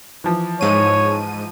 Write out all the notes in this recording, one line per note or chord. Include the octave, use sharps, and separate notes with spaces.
E3 F3
G#2 C#5 D#7